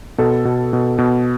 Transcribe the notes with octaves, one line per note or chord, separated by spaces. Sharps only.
B2 A4
B2
B2
B2